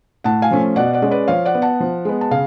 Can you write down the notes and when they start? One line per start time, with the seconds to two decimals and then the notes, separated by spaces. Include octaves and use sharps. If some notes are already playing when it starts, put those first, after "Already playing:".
0.24 A2 F#5 A5
0.42 F5 G#5
0.51 F3 A3 C#4
0.76 B2 D5 F#5
0.93 D5 F#5
1.02 G#3 C#4
1.11 B4 D5
1.28 F3 C#5 F5
1.45 D5 F#5
1.55 B3
1.62 F#5 A5
1.80 F3
2.05 G#3 B3
2.21 A5
2.31 C#3 F5